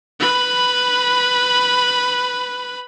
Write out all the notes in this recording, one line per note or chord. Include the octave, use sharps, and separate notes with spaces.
B4 B5